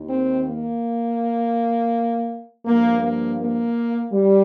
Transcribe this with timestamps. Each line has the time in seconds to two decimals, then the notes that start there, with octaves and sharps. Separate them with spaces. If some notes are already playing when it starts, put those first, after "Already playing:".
Already playing: D#2 D#3
0.08 C4
0.45 A#3
2.65 G2 F3 A#3
3.02 A#3
3.39 A#3
4.13 G3